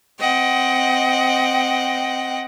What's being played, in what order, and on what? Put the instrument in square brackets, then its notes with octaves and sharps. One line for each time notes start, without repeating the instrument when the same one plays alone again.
[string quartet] C4 D#5 F#5 G5